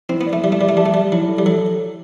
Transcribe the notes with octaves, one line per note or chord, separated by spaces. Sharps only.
C4 E4
B3
D5
A3
G3 E4
A3
G3 D5
A3
G3 A5
A3
G3 A5
F#3 E4
A4
G3
F#3 A4